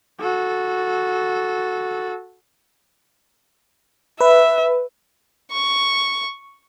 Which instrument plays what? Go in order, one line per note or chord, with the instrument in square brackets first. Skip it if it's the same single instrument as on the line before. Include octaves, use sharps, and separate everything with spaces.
[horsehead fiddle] F#4 A4
[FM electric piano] B4 [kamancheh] E5
[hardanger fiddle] C#6